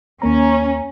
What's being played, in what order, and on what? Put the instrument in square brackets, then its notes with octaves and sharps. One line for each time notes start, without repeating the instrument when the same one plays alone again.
[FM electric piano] D#2 A#3 A#5 [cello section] C#4